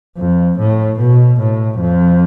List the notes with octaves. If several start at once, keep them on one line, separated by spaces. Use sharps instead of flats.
F2
A2
B2
A2
F2